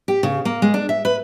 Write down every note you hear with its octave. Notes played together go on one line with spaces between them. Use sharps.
G4
C#3
A#3
G#3
D4
E5
B4